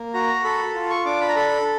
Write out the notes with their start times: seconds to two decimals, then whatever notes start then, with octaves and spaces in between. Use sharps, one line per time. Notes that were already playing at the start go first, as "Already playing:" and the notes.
Already playing: A#3
0.14 F#4 A#5
0.44 A4 B5
0.75 F4
0.90 C#6
1.05 D4 D6
1.21 B5
1.29 A#5
1.36 A4 B5